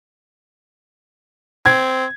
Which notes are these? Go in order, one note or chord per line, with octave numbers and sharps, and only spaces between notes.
C4 G#6